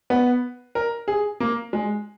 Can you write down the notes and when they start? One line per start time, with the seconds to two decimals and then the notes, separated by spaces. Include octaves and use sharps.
0.10 B3
0.75 A#4
1.08 G#4
1.40 A#3
1.73 G#3